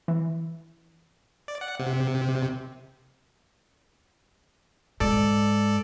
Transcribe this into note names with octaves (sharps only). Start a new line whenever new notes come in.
E3
D5
F#5
C3
G#2 A4 D5